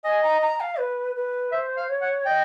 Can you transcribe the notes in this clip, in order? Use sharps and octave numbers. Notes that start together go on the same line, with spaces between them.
D#5 G#5
A#5
A#5
F5
B4
B4
C5 E5
F5
C#5
F#5
D#5 G5